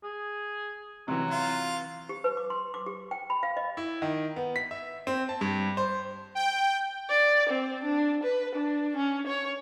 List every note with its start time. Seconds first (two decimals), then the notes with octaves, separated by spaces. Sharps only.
0.04 G#4
1.08 C3 E3 F#3
1.31 F4
2.09 G4
2.24 B4
2.37 D6
2.50 C6
2.74 D6
2.86 G4
3.11 G5
3.30 B5
3.43 F5
3.57 D#5
3.77 E4
4.02 D#3
4.36 B3
4.56 B6
4.71 E5
5.07 C4
5.29 A5
5.41 G2
5.77 C5
6.35 G5
7.09 D5
7.49 C4
7.83 D4
8.23 B4
8.55 D4
8.96 C#4
9.27 C#5